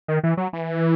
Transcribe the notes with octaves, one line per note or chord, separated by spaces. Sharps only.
D#3
E3
F#3
E3